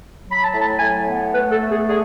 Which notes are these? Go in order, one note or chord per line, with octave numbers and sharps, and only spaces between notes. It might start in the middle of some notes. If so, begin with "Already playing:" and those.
F#3
B5
A5
A2
A5
A2 G#5
B3
A3 B4
A4
A3
G#4
D3 G#4